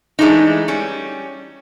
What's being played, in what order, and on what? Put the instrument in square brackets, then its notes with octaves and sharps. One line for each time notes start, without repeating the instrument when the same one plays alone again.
[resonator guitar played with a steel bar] E3 G#3 A3 D4 D#4
G3 C#4